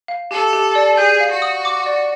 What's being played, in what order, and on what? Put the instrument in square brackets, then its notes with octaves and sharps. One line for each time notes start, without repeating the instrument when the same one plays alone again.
[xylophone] F5
[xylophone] G4 [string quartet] A4
[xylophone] G4
D5
[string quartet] G#4 [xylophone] G6
[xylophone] F5
[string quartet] F#4
[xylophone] D#6
D6
D5